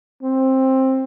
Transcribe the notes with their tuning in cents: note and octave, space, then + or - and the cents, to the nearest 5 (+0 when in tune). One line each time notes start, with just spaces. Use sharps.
C4 +15